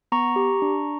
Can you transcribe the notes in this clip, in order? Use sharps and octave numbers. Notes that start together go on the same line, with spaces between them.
B3 A#5 C#6
G4
D4